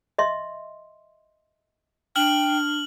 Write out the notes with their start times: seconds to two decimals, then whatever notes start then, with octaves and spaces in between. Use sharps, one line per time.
0.18 D#5 E5 C6
2.16 D4 G5 F6 F#7